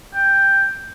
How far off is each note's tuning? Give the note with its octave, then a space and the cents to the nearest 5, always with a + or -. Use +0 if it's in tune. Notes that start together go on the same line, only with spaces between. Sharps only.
G5 +5